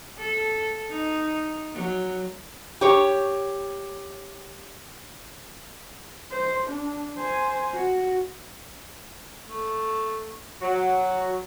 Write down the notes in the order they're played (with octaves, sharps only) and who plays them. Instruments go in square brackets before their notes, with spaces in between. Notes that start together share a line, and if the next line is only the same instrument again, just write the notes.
[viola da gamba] A4
D#4
F#3
[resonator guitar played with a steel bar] G4 C#5
[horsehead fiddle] C5
D4
C5 G#5
F#4
[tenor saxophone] A3
[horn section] F#3 [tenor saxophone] F#4